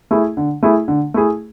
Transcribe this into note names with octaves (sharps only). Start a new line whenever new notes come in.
A3 E4 G#4
D3
A3 E4 G#4
D3
A3 E4 G#4